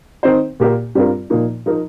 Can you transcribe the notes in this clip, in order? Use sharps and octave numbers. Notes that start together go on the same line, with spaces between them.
D#3 C4 D#4 C5
A#2 A#3 G4 A#4
G2 G3 C4 F4 A#4
A#2 F3 A#3 D#4
F3 D#4 A#4